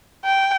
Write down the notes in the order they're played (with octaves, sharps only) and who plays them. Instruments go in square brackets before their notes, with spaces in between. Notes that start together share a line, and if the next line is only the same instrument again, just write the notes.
[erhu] G5